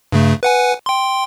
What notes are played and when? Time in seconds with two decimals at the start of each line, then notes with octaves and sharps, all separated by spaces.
0.12 G2 C#3 A3
0.43 B4 F#5 G#5
0.86 G5 C6